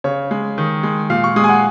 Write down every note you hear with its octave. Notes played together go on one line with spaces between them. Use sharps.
C#3 C#5
G#3
D#3
G#3
A#2 F5
C#6
G#3 D#6
G#5
F#5